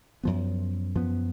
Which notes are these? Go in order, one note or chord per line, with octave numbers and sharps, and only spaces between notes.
F#2 F3 B3
F#2 F3 B3